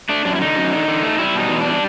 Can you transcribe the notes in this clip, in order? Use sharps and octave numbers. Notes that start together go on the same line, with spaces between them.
A3 D4
F#2 D4
E4
D3 D#4
F#2
D3
D3
A3
G3 E4
B2 D#4
E2
G3 D4